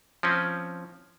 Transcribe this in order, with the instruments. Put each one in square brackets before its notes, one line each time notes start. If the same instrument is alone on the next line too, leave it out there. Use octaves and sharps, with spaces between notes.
[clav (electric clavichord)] F3 C4 C#4